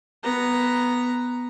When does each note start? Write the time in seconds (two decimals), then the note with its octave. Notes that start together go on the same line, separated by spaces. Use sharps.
0.23 B3 A#5